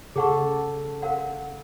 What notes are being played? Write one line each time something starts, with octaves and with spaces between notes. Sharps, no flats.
C#3 G#4 A4 F#5 C#6
A#4 F5 F#5